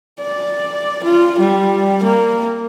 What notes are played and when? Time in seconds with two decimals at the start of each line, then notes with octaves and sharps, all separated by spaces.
0.21 D5
1.04 F4
1.39 G3
2.03 A#3